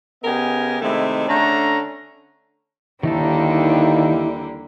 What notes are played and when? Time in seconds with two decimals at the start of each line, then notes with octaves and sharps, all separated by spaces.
0.24 C#3 B3 G4 A#4 D#5 G#5
0.82 C3 D#3 G#3 A3 E4
1.28 D3 A3 C#4 D4 A#5
3.03 D#2 D3 D#3 G3 A#3 D#4 E4 A4